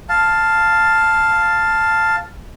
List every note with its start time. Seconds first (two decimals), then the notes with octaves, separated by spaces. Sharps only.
0.09 F5 A5